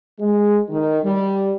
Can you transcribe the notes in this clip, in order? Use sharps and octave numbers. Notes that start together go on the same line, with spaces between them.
G#3
D#3
G3